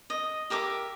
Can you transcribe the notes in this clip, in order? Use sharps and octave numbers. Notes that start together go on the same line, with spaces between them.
D#5
G4 A#4 E5 D6